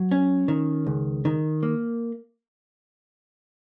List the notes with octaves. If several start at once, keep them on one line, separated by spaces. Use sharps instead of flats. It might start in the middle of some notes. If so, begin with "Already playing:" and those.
Already playing: F#3
C#4
D#3
C#2
D#3
A#3